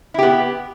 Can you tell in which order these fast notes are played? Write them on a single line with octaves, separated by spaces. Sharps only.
E4 G4 B3